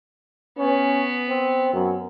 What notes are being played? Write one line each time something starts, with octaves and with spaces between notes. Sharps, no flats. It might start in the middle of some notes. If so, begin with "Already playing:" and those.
B3 C#4
C4
F#2